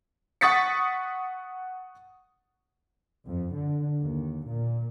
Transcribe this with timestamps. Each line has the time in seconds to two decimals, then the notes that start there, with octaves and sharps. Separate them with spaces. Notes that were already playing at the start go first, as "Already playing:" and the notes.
0.41 F#5 C#6 D#6 A6 B6 C#7
3.27 F2
3.56 D3
4.00 D#2
4.44 A#2